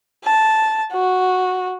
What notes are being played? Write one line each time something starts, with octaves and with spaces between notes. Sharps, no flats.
A5
F#4